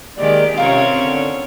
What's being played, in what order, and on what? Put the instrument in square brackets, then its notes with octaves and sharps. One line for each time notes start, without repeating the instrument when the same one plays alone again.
[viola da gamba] D#3 G4 [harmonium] G#3 A#3 D5
[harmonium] C3 [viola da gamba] C4 C#4 C#5 [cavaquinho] F4 A#4
[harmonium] D3